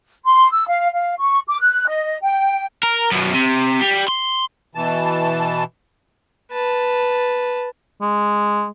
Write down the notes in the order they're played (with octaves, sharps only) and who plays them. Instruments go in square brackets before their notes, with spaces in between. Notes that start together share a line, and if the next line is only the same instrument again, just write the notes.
[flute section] C6
E6
F5
F5
C#6
D6
F#6
D#5
G5
[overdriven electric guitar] A#4
F#2 B2
C3
G3
C6
[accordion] B2 E3 A5
[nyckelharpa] B4 A5
[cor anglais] G#3